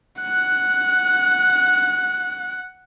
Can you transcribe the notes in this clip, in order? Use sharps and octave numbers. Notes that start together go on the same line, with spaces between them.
F#5 F#6